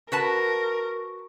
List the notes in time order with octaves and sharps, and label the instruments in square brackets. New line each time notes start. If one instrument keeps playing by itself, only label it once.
[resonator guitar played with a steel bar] F#4 B4 A5 [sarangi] A#4